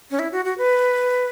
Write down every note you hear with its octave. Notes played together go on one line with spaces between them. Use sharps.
C#4
E4
F#4
F#4
B4